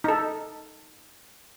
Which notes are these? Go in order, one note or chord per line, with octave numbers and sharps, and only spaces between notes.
D#4 A4